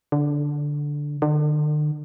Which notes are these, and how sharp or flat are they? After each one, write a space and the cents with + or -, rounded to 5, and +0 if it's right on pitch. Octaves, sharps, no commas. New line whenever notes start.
D3 -5
D3 +40